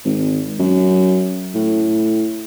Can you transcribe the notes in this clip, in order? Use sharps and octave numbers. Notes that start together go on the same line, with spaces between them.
G#1
F#2
A2